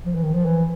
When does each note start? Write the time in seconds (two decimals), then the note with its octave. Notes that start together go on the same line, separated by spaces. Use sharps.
0.06 F3
0.15 E3
0.23 D#3
0.34 F3
0.46 E3